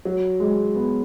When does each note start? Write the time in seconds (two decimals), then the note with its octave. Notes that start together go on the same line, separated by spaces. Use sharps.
0.05 F#3
0.40 G#3
0.75 B3